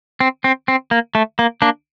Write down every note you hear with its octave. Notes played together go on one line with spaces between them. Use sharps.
C4
C4
C4
A#3
A3
A#3
A#3 D4